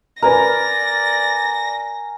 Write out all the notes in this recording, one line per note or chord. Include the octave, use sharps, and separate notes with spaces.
A#4 B4 D5 G#5 A#5 A#6